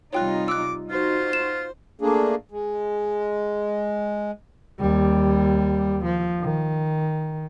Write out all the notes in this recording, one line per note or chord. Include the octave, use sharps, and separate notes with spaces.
C3 G3 D#4 F4 C#5 G5 F#6
D6 E6 F#6
D#4 F4 F#4 C5
E7
A3 A#3 D4 G#4
G#3
D#2 G3
F3
D#3